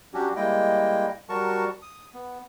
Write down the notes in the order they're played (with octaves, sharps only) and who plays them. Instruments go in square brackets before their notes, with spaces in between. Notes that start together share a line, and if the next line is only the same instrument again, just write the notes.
[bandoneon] F#3 C#4 D4 F#4 G4
G3 G#3 A#3 E4 D#5 G5
F#3 G3 F#4 A#4 A5 C#6
D#6
B3